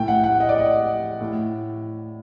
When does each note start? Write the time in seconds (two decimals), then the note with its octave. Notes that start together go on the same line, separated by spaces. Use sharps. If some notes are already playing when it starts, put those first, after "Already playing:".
Already playing: A2 G5
0.08 F#5
0.24 F#5
0.40 D#5
0.49 D5
0.59 D#5
1.20 A2